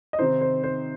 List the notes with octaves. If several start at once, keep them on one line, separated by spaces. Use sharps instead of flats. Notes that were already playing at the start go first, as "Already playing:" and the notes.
D#5
C3 D#3 C4 D#4 C5
C5
C5